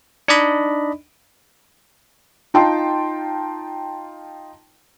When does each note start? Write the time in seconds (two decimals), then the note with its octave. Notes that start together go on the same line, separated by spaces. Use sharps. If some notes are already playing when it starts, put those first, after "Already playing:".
0.28 D4 D#4 D5 D#5 B5
2.54 D#4 F4 G5 A5 C6